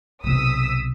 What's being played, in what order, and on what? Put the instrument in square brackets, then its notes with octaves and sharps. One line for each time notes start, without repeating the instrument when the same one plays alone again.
[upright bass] B1 C3 [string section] D#6 E6 B6